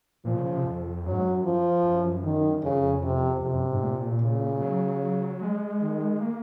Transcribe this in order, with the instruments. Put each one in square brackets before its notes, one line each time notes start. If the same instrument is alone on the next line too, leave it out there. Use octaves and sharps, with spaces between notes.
[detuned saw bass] A#2 [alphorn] F3
[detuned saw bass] C#3
C#3
C3
F2
[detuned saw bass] F#2 [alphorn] F#3
[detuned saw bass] G#2
F#2
[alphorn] F3
[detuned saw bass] F#2
[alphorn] D#3
[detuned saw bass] F2 [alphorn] C#3
[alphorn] C3
[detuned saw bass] F2 [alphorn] C3
[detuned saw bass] F#2
G#2
A#2
[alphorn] C#3
[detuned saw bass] F#3
G#3
[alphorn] D#3
[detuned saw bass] A#3